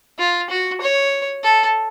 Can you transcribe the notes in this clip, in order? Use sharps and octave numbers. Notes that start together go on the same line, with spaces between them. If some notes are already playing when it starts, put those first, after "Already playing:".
F4
F#4
C#5
A4